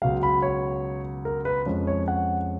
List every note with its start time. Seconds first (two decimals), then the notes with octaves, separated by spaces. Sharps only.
0.02 C#2 B2 F#3 F5
0.23 B5
0.42 C#5
1.25 A#4
1.45 B4
1.66 F2 F3 G#3 C#4
1.87 C#5
2.08 F#5